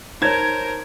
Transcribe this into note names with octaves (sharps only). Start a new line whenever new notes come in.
D#4 A#4 C5 C#5 A5 A#5 G#6